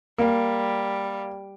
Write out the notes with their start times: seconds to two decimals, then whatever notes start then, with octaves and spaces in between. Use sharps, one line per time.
0.18 G3 A#3